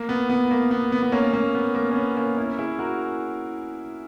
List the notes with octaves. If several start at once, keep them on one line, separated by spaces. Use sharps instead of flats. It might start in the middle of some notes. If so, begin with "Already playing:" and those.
Already playing: A#3
B3
B3
A#3
B3
B3
B3
A#3 C#4
A#3 C#4
B3
A#3
C#4
B3
A#3 C#4
C#4 E4
E4 G#4
F#4 A#4